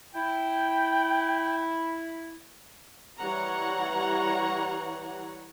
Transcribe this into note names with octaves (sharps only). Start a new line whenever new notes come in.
E4 G5
E3 G3 C#5 F#5 A#5